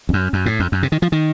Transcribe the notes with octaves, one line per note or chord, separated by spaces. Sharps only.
F2
F#2
F#2
A2
F2
F#2
C3
D#3
F3
D#3